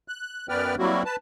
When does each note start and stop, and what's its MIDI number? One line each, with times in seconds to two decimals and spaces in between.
0.08 0.46 90
0.49 0.75 42
0.49 0.75 59
0.49 0.75 71
0.49 0.75 74
0.49 0.75 79
0.49 0.75 89
0.79 1.03 54
0.79 1.03 55
0.79 1.03 58
0.79 1.03 60
0.79 1.03 64
0.79 1.03 66
1.05 1.16 71
1.05 1.16 81